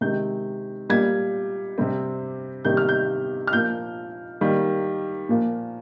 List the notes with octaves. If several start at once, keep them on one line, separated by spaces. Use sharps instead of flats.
C3 D#3 G#3 G6
A#2 G3 A#3 G#6
C3 G3 C4
C3 D#3 G3 A#3 G6
F6
G6
F6
A#2 F3 A#3 G6
D#3 G3 A#3
A#2 F3 A#3